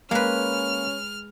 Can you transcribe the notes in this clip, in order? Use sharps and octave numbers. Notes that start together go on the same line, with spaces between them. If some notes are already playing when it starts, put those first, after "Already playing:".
G#3 A#3 C#4 B4 F6